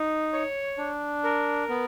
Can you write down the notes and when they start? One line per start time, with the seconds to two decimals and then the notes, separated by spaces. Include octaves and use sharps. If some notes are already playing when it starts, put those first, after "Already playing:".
Already playing: D#4
0.33 C#5
0.78 D4
1.24 A#4
1.69 B3